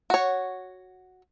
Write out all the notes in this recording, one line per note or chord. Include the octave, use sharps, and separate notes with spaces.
F#4 C#5